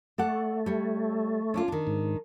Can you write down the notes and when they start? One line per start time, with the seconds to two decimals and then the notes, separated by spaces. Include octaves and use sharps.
0.18 A3 A4 D5 F#5
0.66 G3 C#5
1.54 C#4 D4 F4
1.68 D#3 D4
1.87 G#2